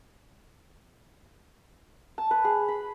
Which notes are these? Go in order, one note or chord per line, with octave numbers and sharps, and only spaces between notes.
A5
B4
G#4
B5